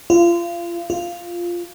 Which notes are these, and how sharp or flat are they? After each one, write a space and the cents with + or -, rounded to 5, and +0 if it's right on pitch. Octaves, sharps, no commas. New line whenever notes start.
F4 -30
F4 -5